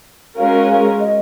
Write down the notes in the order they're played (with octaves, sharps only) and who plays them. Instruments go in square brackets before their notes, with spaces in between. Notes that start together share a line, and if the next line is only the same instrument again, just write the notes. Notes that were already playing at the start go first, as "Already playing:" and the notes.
[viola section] G#3 C#4 F#4 A#4 [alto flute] F5
[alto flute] D#5